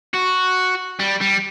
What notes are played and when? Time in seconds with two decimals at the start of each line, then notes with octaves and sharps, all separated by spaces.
0.14 F#4
0.99 G3
1.21 G3